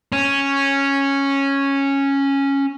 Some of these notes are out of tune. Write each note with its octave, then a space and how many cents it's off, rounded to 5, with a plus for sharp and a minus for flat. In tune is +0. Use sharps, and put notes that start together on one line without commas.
C#4 -5